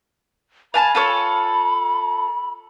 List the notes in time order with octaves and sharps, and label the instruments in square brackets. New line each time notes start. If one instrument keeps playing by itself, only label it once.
[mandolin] F5 G#5 A5 [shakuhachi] B5
[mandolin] F4 A4 C#5